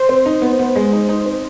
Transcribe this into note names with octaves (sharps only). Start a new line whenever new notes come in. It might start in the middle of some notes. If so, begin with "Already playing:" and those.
Already playing: C5
C4
D#4
B3
B3
G#3
D#4
D#4
C4